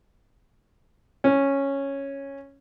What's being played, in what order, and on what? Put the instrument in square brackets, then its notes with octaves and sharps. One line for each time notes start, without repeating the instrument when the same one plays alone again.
[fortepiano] C#4